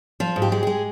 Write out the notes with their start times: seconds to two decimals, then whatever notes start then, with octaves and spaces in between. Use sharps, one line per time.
0.20 F3 F4
0.36 G#2
0.42 G4
0.52 G#3
0.63 G#3 G#4